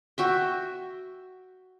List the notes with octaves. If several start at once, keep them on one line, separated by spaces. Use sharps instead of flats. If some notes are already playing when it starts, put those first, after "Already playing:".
F#4 E5 G5